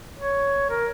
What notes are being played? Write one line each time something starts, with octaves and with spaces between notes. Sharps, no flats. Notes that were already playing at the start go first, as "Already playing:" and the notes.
C#5
A#4